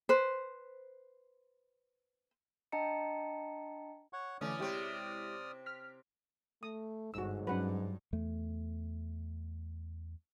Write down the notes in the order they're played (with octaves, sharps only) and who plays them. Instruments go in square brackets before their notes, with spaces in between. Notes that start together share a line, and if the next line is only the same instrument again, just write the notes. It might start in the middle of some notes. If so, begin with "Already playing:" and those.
[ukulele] B4 C5
[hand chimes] D4 D#5 G5 A5 A#5 C#7
[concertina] C#5 F#5 C#6
[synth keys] D3 A3 [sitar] E3 C#4 [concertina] D5 D#6 F6
[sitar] C3 C4 [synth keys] G#3 E4 G4
[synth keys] F6 B6
[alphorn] A3 [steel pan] D#6
[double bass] G1 [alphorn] G#2 [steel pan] F#4 E6
[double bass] G2 [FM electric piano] F#3 C#4 [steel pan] B4 F#5
[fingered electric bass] E2 A3